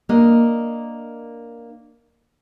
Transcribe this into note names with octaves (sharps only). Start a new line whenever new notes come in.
A#3 D4 D#5